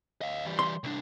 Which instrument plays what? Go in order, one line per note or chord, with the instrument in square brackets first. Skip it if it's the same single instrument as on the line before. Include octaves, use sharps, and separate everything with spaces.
[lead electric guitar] D#5 F5
E3 G3
[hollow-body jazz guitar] C6
[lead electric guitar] C2 D4